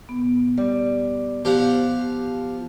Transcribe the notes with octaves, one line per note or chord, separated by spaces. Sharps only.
A#2 B3
G3
F3 B3 G4 F5 F#5